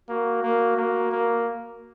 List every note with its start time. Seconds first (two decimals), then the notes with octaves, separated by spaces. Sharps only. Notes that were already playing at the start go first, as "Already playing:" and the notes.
0.09 A#3 F#4
0.43 A#3
0.77 A#3
1.12 A#3